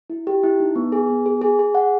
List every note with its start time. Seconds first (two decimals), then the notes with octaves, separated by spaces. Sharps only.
0.10 E4
0.27 G4
0.43 E4
0.60 D#4
0.76 B3
0.92 G#4
1.10 B3
1.26 G#4
1.42 G#4
1.59 G#4
1.75 F#5